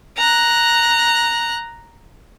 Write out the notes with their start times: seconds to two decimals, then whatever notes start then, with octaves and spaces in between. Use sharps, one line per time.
0.17 A#5 F#6